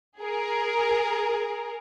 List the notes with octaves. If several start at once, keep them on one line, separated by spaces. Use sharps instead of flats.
G#4 A#4